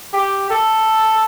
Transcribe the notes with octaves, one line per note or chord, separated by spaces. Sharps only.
G4
A4